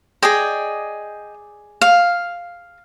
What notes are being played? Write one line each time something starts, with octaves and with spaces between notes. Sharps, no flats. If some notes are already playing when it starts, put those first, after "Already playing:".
G#4 D5 D#5 G5
F5